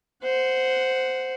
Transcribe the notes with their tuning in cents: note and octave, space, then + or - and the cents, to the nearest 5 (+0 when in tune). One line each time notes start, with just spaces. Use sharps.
C5 -10 F#5 +0